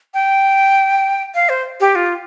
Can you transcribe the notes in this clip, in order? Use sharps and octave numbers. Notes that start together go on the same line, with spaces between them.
G5
F5
C5
G4
F4